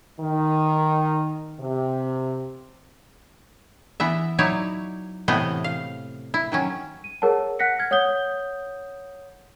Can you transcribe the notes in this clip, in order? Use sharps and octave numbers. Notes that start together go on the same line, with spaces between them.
D#3
C3
E3 B3 E5
F#3 D#4 E4 C#5 D5
A2 C3 E3 A3 B3 D#5
F5
E4
D#3 F#3 C#4
D#7
G#4 A#4 C#5 F#5 A5
F#5 F#6 A#6 B6 C#7
F6 G#6
C#5 F#5 D#6 G6 G7